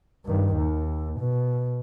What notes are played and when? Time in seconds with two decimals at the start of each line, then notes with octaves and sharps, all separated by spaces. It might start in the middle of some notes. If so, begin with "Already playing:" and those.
0.26 G2 D#3
0.56 D#2
1.20 B2